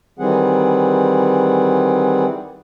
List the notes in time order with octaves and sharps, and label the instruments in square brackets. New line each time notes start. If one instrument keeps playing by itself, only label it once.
[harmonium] D#3 E3 G3 C4 G#4 F#5